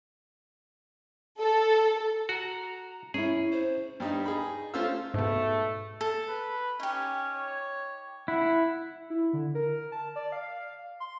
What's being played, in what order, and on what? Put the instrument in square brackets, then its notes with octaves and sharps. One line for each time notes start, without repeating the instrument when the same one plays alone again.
[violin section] A4
[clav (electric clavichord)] F#4 [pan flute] A#5
[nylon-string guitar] C#4 E4 [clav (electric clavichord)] G#4
[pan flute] C5
[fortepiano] G2 G3 D#4
D#4 G#4 B5
A3 C#4 F4 C5 F5 E6
[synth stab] G#2 B2 [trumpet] A3
[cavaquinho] A4 [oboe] A5
[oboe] B4
[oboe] C#4 [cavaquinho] D#4 G4
[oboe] C#5
[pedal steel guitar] E4 [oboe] F#5
[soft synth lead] E4
D3
A#4
A5
D5
F5
C6